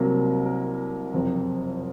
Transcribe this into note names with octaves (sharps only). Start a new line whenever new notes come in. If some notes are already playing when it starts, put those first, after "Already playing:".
Already playing: C2 C3 F#3 A#3 A#4
A#4
F#1 F2 C3